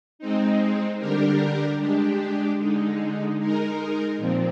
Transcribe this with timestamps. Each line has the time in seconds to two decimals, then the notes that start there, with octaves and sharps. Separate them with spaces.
0.19 G#3 C4 D#4
0.99 D3 G3 D4 G4 A#4
1.79 G#3 D4 G4
2.58 D3 G#3 D#4
3.38 G#3 D#4 A#4
4.18 A#2 F3 C4